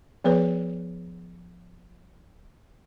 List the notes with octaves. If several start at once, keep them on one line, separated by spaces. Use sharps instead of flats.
F3 B3 G#4 B4 C#5